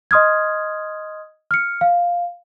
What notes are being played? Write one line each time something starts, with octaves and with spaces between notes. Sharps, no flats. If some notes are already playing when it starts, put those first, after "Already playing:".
D#5 C6 D#6 F6 G#6
F6 C#7
F5